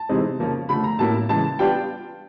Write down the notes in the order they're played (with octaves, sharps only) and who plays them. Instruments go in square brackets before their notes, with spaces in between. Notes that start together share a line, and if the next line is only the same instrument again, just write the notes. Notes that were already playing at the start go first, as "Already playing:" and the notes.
Already playing: [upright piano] A5
C3 E3 G#3 C4 D#4
C#3 F3 A#3 C#4 F4
D3 F3 A3 B5
A#5
A2 F#3 A#3 C#4 E4 A5
C#3 E3 G#3 A5
G3 B3 D4 F4 G5